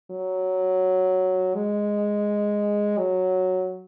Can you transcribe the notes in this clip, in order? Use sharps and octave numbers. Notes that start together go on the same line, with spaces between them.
F#3
G#3
F#3